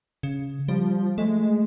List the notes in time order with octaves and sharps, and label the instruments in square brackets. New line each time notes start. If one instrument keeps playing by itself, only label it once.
[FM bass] C#3
[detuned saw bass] F3 [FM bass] G3
[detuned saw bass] G#3 [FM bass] A3